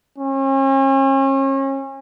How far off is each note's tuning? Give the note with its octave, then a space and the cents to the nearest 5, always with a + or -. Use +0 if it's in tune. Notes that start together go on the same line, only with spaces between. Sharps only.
C#4 -40